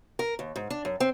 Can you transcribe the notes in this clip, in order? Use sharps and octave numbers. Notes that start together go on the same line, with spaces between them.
A#4
D#2
G#2
D4
F#2
C4